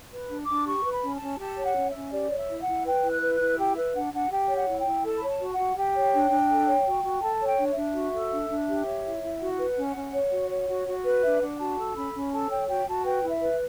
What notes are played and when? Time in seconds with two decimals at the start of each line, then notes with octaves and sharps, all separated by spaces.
0.11 B4
0.30 D4
0.42 D6
0.48 D4
0.66 G4 C#6
0.84 B4
0.90 B5
1.03 C#4
1.14 A5
1.21 C#4
1.39 G4 A5
1.57 C#5
1.63 F#5
1.75 C#4
1.88 E5
1.94 C#4
2.12 G4 D5
2.31 C#5
2.37 E5
2.49 E4
2.61 F#5
2.67 E4
2.85 B4 G5
3.03 E4
3.09 F#6
3.21 B4
3.34 F#6
3.40 E4
3.58 G4 G5
3.75 B4 E5
3.94 D4 F#5
4.12 D4 F#5
4.30 G4 G5
4.49 C#5
4.55 F#5
4.67 E4
4.79 G5
4.85 E4
5.03 A4 A5
5.18 C#5 B5
5.27 A5
5.39 F#4
5.52 F#5
5.58 F#4
5.76 G4 G5
5.95 C#5
6.13 D4
6.31 D4
6.49 A4
6.67 C#5
6.86 F#4
7.04 F#4
7.22 A4 A5
7.41 C#5
7.46 G5
7.58 D4
7.67 D5
7.70 E5
7.77 D4
7.95 F#4
8.13 A4
8.31 D4
8.50 D4
8.67 G4
8.86 C#5
9.05 E4
9.23 E4
9.40 F#4 F#5
9.58 B4
9.76 C#4
9.95 C#4
10.13 C#5
10.32 F#4
10.50 C#5
10.68 F#4
10.87 F#4
11.05 B4
11.23 D4 E5
11.41 D4 F#5
11.59 F#4 A5
11.77 A4
11.95 C#4 B5
12.14 C#4
12.32 A4 A5
12.50 C#5 G5
12.68 F#4 G5
12.87 F#4 A5
13.05 B4 G5
13.23 E4
13.30 E5
13.42 B4